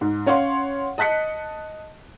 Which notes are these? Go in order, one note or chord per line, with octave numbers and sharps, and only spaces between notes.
G#2
C#4 C#5 F5 F#5 C6
D#5 A5 F#6 B6 C#7